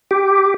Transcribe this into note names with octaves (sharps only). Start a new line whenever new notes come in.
G4